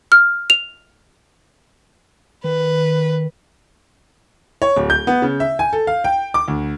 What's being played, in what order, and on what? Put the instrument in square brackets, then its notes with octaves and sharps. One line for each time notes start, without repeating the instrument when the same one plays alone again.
[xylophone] F6
F7
[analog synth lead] D#3 [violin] B4
[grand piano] C#5
D1
G6
B3
C#3
E5
G#5
A4
F5
G5
D6
D2